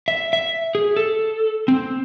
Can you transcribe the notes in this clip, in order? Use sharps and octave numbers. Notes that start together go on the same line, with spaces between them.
E5
E5
G#4
A4
C4